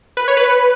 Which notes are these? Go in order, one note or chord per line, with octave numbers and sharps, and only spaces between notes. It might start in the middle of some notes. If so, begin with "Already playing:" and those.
B4
C#5
B4